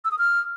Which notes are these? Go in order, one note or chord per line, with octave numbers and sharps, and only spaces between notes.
E6
D#6
F6